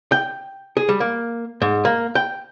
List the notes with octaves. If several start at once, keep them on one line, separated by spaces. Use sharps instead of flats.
G5
G#4
G3
A#3
G#2
A#3
G5